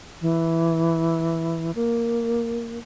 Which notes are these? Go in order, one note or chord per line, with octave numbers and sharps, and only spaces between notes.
E3
A#3